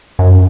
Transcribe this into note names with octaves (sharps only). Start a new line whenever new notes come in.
F#2